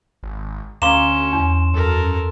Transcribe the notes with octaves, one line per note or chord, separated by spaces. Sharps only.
G#1
D2 C#4 F5 A#5 C6 D6 E7
E2
F#2 A4 A#4